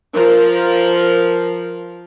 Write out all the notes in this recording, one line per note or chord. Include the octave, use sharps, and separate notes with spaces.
F3 A#4